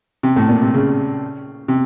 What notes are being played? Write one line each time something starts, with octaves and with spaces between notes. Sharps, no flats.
C3
A2
A#2
C3
C#3
C3